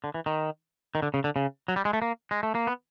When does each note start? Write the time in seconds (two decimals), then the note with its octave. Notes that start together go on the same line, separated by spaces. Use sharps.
0.04 D3
0.14 E3
0.26 D#3
0.95 D#3
1.02 D3
1.14 C#3
1.24 D3
1.36 C#3
1.68 F#3
1.76 G3
1.85 G#3
1.93 A3
2.02 A#3
2.31 G#3
2.43 A3
2.55 A#3
2.67 B3